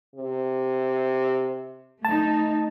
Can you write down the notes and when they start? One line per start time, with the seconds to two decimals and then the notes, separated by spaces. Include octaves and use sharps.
0.16 C3
2.05 A3 D#4 A5